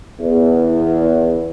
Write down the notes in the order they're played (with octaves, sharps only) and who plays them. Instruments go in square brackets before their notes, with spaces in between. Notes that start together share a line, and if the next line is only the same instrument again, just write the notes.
[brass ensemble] E2